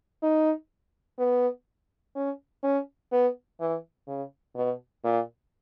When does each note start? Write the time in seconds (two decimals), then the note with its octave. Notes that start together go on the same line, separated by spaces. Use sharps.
0.23 D#4
1.19 B3
2.16 C#4
2.63 C#4
3.12 B3
3.60 E3
4.08 C#3
4.56 B2
5.04 A#2